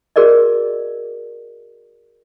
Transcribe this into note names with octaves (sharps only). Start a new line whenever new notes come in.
F#4 G#4 A#4 D5 D#5